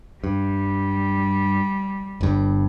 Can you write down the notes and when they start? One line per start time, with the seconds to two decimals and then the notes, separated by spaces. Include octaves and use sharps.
0.24 G2 G3
2.21 G1 G2